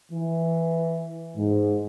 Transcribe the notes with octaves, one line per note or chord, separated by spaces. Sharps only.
E3
G#2